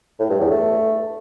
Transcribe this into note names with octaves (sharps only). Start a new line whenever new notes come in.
A2
G2
E2
A3